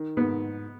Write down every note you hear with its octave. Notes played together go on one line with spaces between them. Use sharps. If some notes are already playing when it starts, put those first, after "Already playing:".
Already playing: D#3
G#2 B3